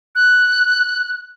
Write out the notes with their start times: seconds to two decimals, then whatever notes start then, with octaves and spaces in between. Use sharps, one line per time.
0.15 F#6